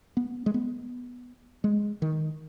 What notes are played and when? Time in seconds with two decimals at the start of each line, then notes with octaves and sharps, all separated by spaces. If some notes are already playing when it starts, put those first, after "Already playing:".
0.17 B3
0.46 G#3
0.54 B3
1.64 G#3
2.02 D#3